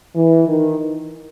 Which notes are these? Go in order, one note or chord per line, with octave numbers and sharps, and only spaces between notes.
E3
D#3